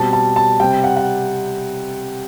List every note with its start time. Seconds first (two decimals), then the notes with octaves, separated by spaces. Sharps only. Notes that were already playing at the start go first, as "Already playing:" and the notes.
Already playing: B2 G3 C4 A5
0.13 A5
0.36 A5
0.60 C3 G3 C4 G5
0.84 F#5
0.97 F#5